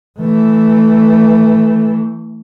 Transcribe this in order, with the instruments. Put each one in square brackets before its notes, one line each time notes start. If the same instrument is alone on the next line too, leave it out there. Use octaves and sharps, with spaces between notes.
[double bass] E3 A3